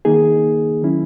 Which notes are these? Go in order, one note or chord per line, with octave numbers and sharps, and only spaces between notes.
D#3 A#3 D#4 G#4
D#3 F#3 C#4 E4